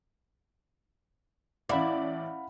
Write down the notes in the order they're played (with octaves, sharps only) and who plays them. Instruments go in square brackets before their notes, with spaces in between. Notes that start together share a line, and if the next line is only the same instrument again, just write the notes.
[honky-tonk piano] A1 D5 [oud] E4 [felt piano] F5 F#5 B5